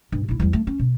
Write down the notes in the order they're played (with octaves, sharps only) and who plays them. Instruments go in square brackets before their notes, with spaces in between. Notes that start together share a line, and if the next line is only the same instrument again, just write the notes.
[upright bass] G2
A#1 E4
E2 G3
A3
C#4
B2